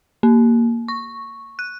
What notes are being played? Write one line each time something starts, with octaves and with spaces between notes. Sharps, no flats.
A#3
C#6
F#6